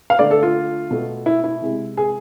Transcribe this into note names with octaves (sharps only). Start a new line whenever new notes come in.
F5
D3 A3 D5
A4
F4
B2 A3
E4
E4
C3 G#3
G#4